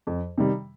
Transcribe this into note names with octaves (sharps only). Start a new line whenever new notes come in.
F2
C3 D#3 G3